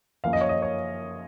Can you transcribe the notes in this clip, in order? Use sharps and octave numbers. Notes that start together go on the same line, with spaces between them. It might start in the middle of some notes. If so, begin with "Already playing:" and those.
F#2 F3 A#3 F5
D#5
C#5
D#5
C#5